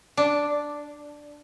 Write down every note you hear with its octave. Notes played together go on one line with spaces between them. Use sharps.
D4